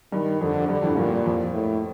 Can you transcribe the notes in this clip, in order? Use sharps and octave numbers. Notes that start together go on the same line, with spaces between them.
G2 D#3
F2 D3
G2 D3
F2 A2
G2 A#2
F2
A2